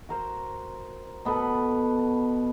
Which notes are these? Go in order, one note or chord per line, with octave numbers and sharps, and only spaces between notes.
F#4 A#4 C5
B2 B3 A4 B4